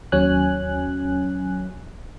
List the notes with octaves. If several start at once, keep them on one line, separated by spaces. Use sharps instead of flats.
D#2 F#3 C#4 G#5 F#6